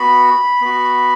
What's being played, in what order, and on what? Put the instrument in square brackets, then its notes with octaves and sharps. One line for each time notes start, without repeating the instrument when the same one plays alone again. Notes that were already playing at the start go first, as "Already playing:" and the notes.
Already playing: [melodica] B3 F#4 B5
B3 F#4